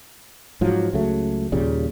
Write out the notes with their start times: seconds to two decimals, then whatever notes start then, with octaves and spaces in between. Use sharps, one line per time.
0.61 G#2 F3 F#3
0.93 C#2 C#3 F#3 A3
1.52 D#2 A#2 C#3 G3